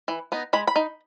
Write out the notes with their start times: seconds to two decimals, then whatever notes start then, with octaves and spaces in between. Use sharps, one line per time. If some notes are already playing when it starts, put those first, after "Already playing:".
0.08 E3
0.32 B3 D#4
0.53 G#3 B5
0.67 B5
0.76 D#4